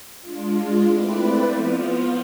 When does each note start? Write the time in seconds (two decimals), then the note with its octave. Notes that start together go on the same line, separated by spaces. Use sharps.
0.21 G#3 D4 F4
0.81 A3 C4 E4 B4 D5
1.41 F3 B3 F4